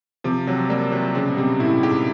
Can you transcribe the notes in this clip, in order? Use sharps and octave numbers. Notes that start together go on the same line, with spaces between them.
C3 F3
C3 F#3
G3 A#3
C3 F#3
C#3 C4
B2
C3 G3
A2 E4
G#2 G4